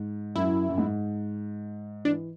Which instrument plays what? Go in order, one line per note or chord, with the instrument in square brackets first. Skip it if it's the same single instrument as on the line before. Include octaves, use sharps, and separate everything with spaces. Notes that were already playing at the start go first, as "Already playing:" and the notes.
Already playing: [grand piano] G#2
[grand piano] F#2 [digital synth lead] E4
[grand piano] F#2
G#2
[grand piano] E3 [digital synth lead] D4